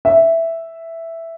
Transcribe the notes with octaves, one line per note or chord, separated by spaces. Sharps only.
E5